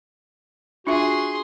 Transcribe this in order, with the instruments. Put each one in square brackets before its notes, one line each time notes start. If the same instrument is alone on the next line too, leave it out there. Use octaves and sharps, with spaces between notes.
[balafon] D4 F4 E5 [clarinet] F#4 [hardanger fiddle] G#4 C6